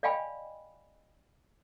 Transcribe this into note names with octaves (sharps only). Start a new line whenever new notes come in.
D5 D#5 F5 G5 G#5 B5